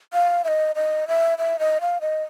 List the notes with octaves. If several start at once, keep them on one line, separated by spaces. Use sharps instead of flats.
F5
E5
D#5
D#5
E5
E5
D#5
F5
D#5